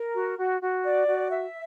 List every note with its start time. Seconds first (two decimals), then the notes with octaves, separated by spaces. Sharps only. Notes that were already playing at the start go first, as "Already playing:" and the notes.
Already playing: A#4
0.14 F#4
0.37 F#4
0.61 F#4
0.83 D5
1.06 F#4
1.30 E5